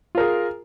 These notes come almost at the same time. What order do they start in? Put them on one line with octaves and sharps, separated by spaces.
F4 A#4 G#4